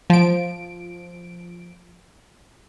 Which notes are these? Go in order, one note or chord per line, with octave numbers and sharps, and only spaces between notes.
F3 D7